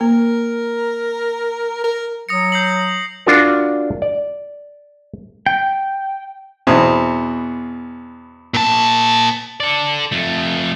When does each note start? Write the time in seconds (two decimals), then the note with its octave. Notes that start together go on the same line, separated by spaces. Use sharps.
0.01 A#3 A#4
1.84 A#4
2.29 F#3 D#6 A#6 C#7
2.52 G6 C7 F#7
3.26 D4 F4 F#4 A#4
4.02 D5
5.46 G5
6.67 E2 B2 C4
8.54 A#2 A5
9.60 A4 D5
10.12 F2 A3